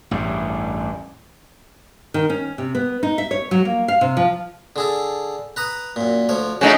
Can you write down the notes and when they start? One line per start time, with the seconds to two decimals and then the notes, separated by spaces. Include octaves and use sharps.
0.11 A1 E2 G2
2.14 D#3
2.30 C#4
2.58 C3
2.75 B3
3.03 D#4
3.18 E5
3.31 C#5
3.51 F#3
3.65 A#3
3.88 F5
4.01 C3
4.17 F3
4.76 D3 G#4 A4
5.56 B4 A#5 D#6
5.96 F#2 A#2
6.29 D2 F3 C#5
6.61 C#3 A3 D#4 F#4